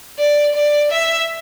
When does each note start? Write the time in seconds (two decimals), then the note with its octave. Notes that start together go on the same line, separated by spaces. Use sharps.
0.19 D5
0.55 D5
0.92 E5